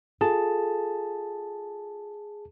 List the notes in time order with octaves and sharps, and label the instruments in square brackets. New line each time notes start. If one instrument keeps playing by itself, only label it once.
[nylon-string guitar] F4 A4 [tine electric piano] G#4 A5